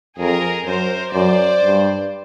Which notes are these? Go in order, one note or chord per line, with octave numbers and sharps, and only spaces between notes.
F2 G#4 A#4
F#2 A#4 C5
F#2 C5 D5
G2